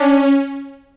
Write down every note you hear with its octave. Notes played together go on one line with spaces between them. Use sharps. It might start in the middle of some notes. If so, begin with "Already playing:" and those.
Already playing: C#4 D4